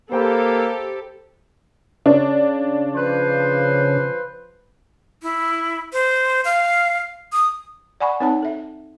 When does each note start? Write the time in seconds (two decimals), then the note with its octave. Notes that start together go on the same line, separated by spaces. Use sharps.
0.12 A#3 G4 A4 C5 G5 B5
2.06 C#3 D4
2.96 F3 B4 C5
5.22 E4
5.93 C5
6.45 F5
7.33 D#6
8.00 D5 F#5 G#5 B5 C#6
8.20 C4 D#4 C#5 F#5 A5
8.43 A4 E5